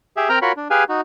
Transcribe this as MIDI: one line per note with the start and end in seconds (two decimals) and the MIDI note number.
0.17 0.29 67
0.17 0.29 68
0.17 0.29 76
0.29 0.39 60
0.29 0.39 70
0.29 0.39 79
0.29 0.39 82
0.29 0.39 89
0.42 0.52 65
0.42 0.52 66
0.42 0.52 70
0.42 0.52 73
0.42 0.52 83
0.57 0.68 62
0.70 0.84 67
0.70 0.84 68
0.70 0.84 71
0.70 0.84 77
0.70 0.84 80
0.89 1.01 63
0.89 1.01 66